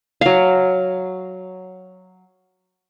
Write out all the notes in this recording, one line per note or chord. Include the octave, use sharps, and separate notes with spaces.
F#3 F5